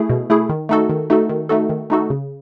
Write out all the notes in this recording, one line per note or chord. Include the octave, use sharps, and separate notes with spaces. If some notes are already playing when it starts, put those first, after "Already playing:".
Already playing: A3 E4 G#4
B2
A3 E4 G#4
D#3
A3 D#4 F#4 A4
D#3
A3 D#4 F#4 A4
D#3
A3 D#4 F#4 A4
D#3
A3 D#4 F#4 A4
C#3